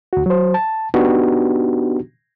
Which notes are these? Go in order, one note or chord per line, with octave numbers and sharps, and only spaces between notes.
D2 F#4
F#3 C5
A5
B3 D4 D#4 F#4 G4